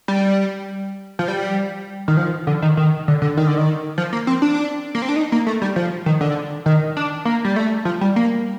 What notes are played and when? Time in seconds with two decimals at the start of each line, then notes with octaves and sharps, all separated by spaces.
0.08 G3
1.19 F3
1.28 G3
2.08 D#3
2.17 F3
2.47 D3
2.62 D#3
2.77 D#3
3.08 D3
3.22 D3
3.37 D#3
3.47 D3
3.57 D#3
3.98 F3
4.13 A#3
4.27 C4
4.42 D4
4.95 A#3
5.02 C4
5.09 D4
5.16 D#4
5.32 A#3
5.47 A3
5.62 G3
5.76 F3
6.06 D#3
6.21 D3
6.66 D#3
6.97 D4
7.25 A#3
7.45 G3
7.56 A3
7.85 F3
8.01 G3
8.16 A#3